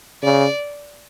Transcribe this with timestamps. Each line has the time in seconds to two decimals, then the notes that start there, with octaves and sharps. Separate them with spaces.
0.23 C#3 D5